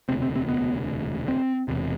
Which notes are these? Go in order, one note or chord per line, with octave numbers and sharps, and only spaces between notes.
E1 D2 C3 C4
C4
C4
B3
C4
E1 E2 C3